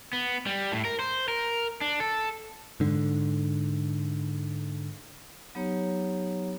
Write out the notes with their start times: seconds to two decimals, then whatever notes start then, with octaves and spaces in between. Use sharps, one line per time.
0.13 B3
0.46 G3
0.72 A2
0.85 A#4
0.99 C5
1.28 A#4
1.81 D4
2.00 A4
2.80 G#2 D3
5.55 F#3 B3 D#4 G4 C#5 A#5